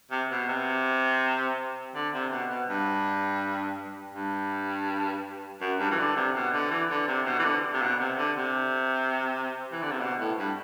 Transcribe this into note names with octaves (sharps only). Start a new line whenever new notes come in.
C3
B2
C3
D3
C3
B2
B2
G2
G2
F#2
G2
E3
D3
C3
B2
D3
E3
D3
C3
B2
E3
D3
C3
B2
C3
D3
C3
E3
D3
C3
B2
A2
G2